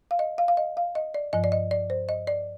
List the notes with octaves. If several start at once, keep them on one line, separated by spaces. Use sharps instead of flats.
F5
D#5
F5
F5
D#5
F5
D#5
D5
G2 F3 D#5
D5
D#5
D5
C5
D#5
D5